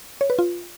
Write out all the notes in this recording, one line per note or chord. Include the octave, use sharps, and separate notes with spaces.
C#5
B4
F4